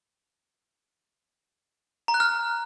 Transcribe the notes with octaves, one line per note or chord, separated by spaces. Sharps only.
A#5
F#6
F6